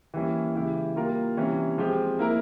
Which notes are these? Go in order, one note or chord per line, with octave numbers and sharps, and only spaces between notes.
E3 G3 A#3 C#4 E4
C#3 E3 G#3 E4 G4
G3 A#3 F4 A#4
C3 E3 G3 C#4
F3 G#3 C4 G4
A#3 E4 A#4